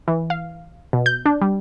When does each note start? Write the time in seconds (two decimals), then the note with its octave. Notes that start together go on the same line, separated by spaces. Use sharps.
0.08 E3
0.30 F5
0.93 B2
1.06 G6
1.26 D4
1.41 G3